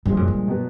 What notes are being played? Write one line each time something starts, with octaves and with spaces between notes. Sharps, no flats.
G2 A#2 F3 G#3
F#2
G2
B2 F#3 B3